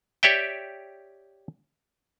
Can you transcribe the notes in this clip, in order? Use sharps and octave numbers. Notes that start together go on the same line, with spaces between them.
G4 C#5 D5 E5 G5